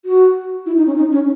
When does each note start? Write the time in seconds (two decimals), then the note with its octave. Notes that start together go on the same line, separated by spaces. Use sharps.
0.05 F#4
0.66 E4
0.77 D#4
0.86 C#4
0.96 D#4
1.12 C#4